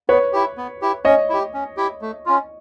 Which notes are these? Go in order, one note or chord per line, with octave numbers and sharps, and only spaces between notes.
B3 B4 C#5
E4 G4
B3
E4 G4
C#4 C#5 D#5
E4 G4
C#4
E4 G4
A3
C#4 F4